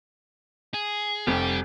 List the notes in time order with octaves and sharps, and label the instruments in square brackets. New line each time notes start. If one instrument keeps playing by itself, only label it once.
[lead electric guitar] G#4
[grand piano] F1 [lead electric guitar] G3 G4